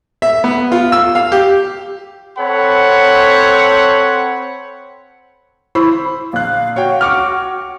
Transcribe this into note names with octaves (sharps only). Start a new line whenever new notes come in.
E5
B3
F4
E6
F5
G4
C4 A4 C5 C#5 F#5 B5
E4 C5 B5 E6
A#1 F5 F#6
F#4 C#5 F5 G5
C#6 D6 F6